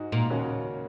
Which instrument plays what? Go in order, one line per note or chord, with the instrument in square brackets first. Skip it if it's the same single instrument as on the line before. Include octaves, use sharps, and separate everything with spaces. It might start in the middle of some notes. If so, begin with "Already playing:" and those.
Already playing: [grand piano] G#2 G#3 D#4 F#4
[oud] A#2
[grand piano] D#2 C#3 A#3 C#4 F#4